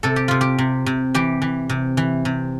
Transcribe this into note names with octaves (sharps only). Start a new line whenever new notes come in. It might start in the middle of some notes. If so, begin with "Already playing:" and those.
C3 A4
G4
C3 F4
G4
C3
C3
E3 G4
E3
C3
E3
C3